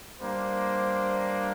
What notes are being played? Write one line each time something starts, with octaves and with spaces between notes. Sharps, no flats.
G3 A#3 D4 C5